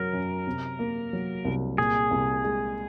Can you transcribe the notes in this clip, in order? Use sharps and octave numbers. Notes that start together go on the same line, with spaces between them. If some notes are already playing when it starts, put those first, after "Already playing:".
Already playing: F#2 F#3 A#4
F#2
C3
A#3
F#3
C2
A#2 G#4
C2
G#3